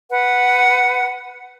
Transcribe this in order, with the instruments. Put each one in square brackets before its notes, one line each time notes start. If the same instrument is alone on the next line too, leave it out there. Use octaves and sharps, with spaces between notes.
[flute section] B4 F#5